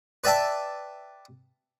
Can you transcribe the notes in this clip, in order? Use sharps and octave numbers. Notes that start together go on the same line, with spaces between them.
B4 D5 E5 G5 A5